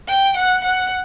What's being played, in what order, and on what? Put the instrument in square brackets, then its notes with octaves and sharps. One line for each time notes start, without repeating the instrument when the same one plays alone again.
[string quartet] G5
F#5
F#5